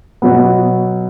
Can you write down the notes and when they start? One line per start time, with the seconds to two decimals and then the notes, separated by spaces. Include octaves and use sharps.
0.22 B2 F#3 B3